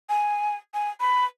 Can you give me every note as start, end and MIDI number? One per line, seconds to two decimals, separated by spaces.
0.09 0.56 80
0.74 0.90 80
1.00 1.25 83